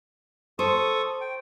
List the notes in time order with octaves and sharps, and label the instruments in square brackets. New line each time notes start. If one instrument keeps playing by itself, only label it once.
[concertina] A4 C#6 D#6 [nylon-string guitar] C5
[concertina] G5